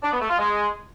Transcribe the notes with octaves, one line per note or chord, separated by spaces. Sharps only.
D4
B3
A3
F4
G#3